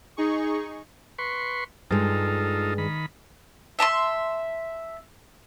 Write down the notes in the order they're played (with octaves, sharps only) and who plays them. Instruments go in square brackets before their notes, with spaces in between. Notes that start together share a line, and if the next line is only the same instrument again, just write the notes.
[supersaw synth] D#4 G#4 C#6
[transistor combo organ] B4 C6 C#6
[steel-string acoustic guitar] G2 G#3 [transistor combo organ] D#4 F4 A4
[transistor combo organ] D#3 B5
[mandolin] E5 A5 A#5 C6